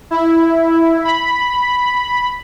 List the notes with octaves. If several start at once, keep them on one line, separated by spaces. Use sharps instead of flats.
E4
B5